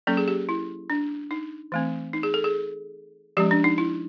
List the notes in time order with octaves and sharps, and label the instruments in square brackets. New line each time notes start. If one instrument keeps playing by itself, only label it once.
[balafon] F#3 A#3 C#4 A4
G#4
G4
E4
D4
D#4
E3 A3 C4
D#4
G#4
A4
G#4
F3 G#3 C#4 G4
D4
D#4
E4